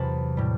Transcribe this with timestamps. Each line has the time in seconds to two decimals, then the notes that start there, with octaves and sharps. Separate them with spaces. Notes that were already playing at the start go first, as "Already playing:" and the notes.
Already playing: E2 C3 F#3 A5 B5
0.37 A2 G3